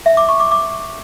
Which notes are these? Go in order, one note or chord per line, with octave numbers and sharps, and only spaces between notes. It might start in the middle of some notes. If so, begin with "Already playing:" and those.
E5
D6
C#6
D6
D6